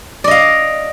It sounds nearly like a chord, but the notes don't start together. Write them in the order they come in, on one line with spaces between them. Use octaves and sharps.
D5 D#5 F5